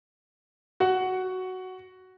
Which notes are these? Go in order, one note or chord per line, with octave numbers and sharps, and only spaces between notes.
F#4 F#5